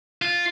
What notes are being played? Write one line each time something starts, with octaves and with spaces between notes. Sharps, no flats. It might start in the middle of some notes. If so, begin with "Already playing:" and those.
F4